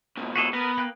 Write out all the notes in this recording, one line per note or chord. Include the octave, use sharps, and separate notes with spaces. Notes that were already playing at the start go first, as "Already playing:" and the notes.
G#2 B2
F#4 G#4 A4
B3 A#4 B4
A#3 G5 F#6